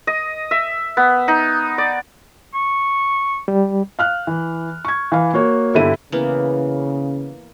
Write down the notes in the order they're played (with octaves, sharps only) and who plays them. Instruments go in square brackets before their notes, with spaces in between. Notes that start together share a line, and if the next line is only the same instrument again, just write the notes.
[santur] D#5
E5
B3
D#4
D5
[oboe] C#6
[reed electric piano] G3
[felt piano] F5 F6 F#6
E3
C#6 G#6
E3 F5
A#3 F#4 C#5
G1 D3 E4 G4 D#7
[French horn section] C#3 [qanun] E3 A#3 B3